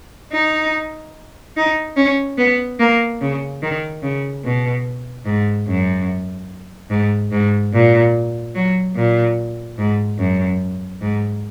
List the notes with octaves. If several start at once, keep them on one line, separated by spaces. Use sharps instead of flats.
D#4
D#4
C#4
B3
A#3
C#3
D#3
C#3
B2
G#2
F#2
G#2
G#2
A#2
F#3
A#2
G#2
F#2
G#2